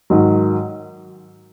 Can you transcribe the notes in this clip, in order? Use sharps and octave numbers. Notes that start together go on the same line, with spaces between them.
G#2 D#3 F#3